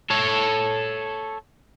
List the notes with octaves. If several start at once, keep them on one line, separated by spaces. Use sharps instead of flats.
A4 C#5